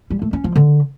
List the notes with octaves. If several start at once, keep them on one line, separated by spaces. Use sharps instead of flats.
G3
A3
C#4
F3
D3